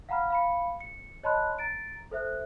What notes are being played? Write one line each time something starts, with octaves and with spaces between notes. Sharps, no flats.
F5 F#5 A#5 B5 F6
F5 B5 C#7
C#7
C#5 D#5 A5 B5 C6 F#6
A#5 A6 D7
A4 C5 E5 F#6